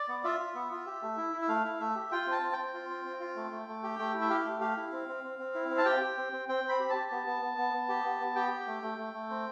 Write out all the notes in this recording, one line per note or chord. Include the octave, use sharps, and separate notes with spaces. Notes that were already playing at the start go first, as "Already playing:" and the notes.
Already playing: D5
B3
F4 E5
F4
B3
F4
G4
A3
E4
E4
E5
A3 F5
E4
A3 E5
G4
F4 G5
C4 A5
C4
G5
C4
F4
C4
C4
F4
A3
A3
A3
G4
A3 G5
E4
E5
G4 F5
A3
G4 F5
E4
C4
C4
C4
C4
E4
C4
A5
G4 G5
G4
C4
C4
C4 G5
C4
B5
G4
A5
G4
B3
B3
B3
B3
B3
G4
B3
B3
G4 G5
G4
A3
A3
A3
A3
C4